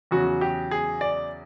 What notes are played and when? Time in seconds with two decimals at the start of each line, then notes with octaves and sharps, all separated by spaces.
0.11 E2 C#3 F#3 F#4
0.41 G4
0.71 G#4
1.01 D5